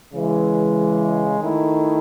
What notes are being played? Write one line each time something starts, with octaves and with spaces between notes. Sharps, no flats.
C#3 E3 G#3
D#3 A3 E4